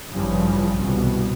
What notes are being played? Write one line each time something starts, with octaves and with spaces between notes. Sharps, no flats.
A1 G2 C#3 E3 F3 G3
C2 B2